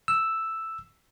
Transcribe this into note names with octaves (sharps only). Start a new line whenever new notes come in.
E6